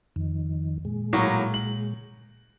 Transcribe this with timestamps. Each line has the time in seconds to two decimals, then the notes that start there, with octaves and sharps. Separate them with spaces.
0.16 F2 D#3
0.85 A#2 G#3
1.13 A2 F#3 A#3
1.54 F#7